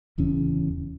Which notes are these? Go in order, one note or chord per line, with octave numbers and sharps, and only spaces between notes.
D1 E2 C#3 C#4